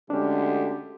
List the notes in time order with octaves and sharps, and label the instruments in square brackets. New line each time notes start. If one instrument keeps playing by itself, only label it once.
[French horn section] D2 D3 G#3 [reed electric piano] C#4 D4 [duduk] G4